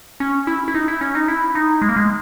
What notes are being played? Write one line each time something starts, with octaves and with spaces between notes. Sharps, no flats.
C#4
E4
E4
D#4
E4
C#4
D#4
E4
D#4
G#3
A#3
G#3